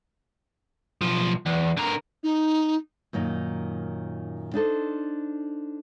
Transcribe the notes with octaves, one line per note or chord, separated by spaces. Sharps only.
B1 F3
E2
D3 A#4
D#4
F#2 A#2 D#3 D#4
D4 D#4 A4 C5